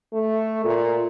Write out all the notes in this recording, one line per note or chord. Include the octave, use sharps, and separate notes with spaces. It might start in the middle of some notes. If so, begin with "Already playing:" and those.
A3
A#2